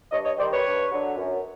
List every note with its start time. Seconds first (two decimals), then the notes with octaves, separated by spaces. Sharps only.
0.11 G2 C#5 D#5
0.24 C#5 D#5
0.38 D#3 G3 C5 D5
0.51 B4 C#5
0.65 G2
0.91 D3 F#3
1.17 F#2